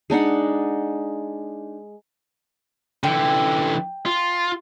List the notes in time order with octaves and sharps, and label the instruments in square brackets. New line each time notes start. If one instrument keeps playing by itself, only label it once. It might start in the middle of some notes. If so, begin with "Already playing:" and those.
[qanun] G#3 D4 D#4 F#5
[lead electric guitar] D3 E3 [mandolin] G5
[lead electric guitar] F4